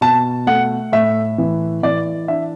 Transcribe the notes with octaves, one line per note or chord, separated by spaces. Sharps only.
B2 A5
A3 F#5
A2 E5
E3
E3 D5
D4 E5